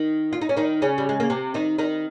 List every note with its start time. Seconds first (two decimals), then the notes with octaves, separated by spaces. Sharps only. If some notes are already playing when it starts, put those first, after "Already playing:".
Already playing: D#3 D#4
0.33 F4
0.41 D#4
0.49 C#4
0.57 D#3 D#4
0.82 C#3 C#4
0.98 G3
1.09 G#3
1.20 A#3
1.30 C3 C4
1.54 D#3 D#4
1.78 D#3 D#4